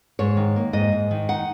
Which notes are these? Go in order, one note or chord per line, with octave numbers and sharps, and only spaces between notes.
G#2 C#5
D#3
A#3
G#2 D#5
G#2
D#3
D#4 F#5